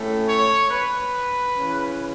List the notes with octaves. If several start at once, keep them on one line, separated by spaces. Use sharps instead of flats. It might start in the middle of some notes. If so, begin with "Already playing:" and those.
Already playing: A2 A3 C#4
C#5
B4
C#3 E3 C#4